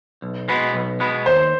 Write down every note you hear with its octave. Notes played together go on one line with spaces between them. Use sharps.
B1
B2 G#3 B3
B1
B2 G#3 B3
D#2 C5